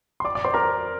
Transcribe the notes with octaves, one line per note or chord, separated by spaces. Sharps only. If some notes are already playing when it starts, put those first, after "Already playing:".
C6
D5 D6
D5 D6
C5 C6
A#4 A#5